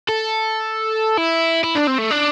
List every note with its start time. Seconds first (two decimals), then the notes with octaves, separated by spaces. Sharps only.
0.09 A4
1.17 E4
1.64 E4
1.75 D4
1.88 C4
1.98 A3
2.11 D4